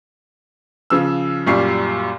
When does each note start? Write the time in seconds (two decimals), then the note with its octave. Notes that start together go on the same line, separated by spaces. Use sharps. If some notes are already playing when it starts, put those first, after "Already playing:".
0.90 C#3 F3 E6
1.47 F#2 A#2 G3 F5 C#6 C7